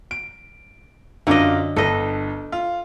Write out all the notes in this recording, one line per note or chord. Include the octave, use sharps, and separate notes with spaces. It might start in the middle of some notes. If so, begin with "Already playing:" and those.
D7
F#2 D3 F4 D#5 D6
G1 D3 A4 D#5
F4